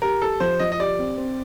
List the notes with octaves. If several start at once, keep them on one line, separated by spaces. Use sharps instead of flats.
G4 A#4
G4 A4
F3 C5
F3 D#5
D#5
G4 D5
C4
C4